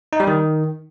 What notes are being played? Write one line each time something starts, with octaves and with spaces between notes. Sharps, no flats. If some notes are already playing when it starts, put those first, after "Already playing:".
D#4
G3
D#3